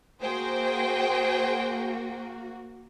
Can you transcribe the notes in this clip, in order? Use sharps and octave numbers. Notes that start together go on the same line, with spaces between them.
A#3 F#4 G#4 C5 G5